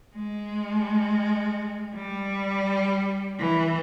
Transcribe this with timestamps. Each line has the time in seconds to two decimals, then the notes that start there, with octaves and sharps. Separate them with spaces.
0.16 G#3
1.95 G3
3.39 E3